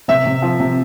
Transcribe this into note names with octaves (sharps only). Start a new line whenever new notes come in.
C3 E5
C3
F3
C3